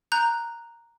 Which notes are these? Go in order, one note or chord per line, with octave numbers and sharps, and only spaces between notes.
A#5 F#6 G6